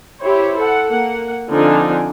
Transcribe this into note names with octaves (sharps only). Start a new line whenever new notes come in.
E4 G4 C5 C#5
A4 F#5
A#3 F#5
D3 F3 C4 D4 D#4 G#5